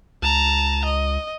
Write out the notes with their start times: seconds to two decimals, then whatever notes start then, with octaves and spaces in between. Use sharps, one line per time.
0.22 C#2 A5 A#5
0.85 D#5